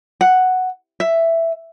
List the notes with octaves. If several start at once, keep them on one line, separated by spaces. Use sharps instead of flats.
F#5
E5